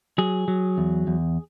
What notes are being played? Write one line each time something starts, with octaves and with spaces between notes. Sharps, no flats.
F#3 G#4
F#3
E2
E2